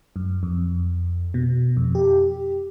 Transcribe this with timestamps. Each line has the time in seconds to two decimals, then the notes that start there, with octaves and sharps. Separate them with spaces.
0.16 F#2
0.43 F2
1.34 B2
1.77 F2
1.95 G4